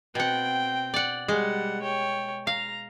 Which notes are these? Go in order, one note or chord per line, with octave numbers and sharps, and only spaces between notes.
B2 C4 F#5 G5
D5 F#5
G3 G#3 F#5
C#5 G5
F5 A#5